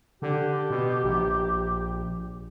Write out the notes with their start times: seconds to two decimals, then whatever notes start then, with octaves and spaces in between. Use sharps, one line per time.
0.22 D3 G4
0.70 B2
1.04 A#1